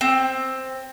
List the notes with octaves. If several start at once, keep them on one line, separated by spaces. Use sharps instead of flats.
C4